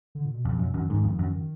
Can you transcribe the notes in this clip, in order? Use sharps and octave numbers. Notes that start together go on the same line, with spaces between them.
D3
A#2
B2
F2
F#2
F#2 D#3
G#2 D#3
F2
F#2
D#3